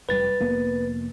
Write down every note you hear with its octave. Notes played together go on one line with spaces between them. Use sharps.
F1 B2 G3 B4 A6
F1 A#3 B3